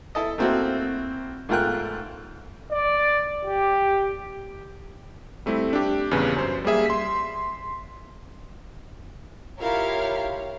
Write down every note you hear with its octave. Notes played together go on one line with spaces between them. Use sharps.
E4 A4 D#5
A3 A#3 C4 E4 F#4
G#2 A3 F4 A#4 G5 F#6
D5
G4
G3 A3 C4 E4
D4 G4
A#1 E2 G2 C#3 B4
F#2 C5
G3 A#3 G#4 E5
C6 B6
E4 F4 G4 A#4 C#5 F5